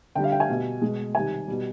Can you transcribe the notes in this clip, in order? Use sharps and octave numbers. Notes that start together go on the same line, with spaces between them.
D3 G3 G5
F5
G5
G#5
B2 G3
B2 G#3
C3 D#3 G3 G#5
B2 G3